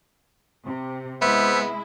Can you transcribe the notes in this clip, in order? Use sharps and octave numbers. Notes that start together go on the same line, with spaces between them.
C3
G#3 B3 E4 C5 E5